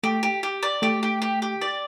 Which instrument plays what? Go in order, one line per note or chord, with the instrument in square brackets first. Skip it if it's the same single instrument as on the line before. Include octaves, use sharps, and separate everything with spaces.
[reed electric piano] A3 [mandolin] G4
[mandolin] G4
G4
D5
[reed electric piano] A3 [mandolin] G4
[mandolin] G4
G4
G4
D5